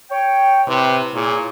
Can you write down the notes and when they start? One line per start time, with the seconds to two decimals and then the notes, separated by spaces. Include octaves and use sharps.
0.10 C#5 G5
0.67 A2 C3 B4
1.14 A#2 E4 G#4 C#5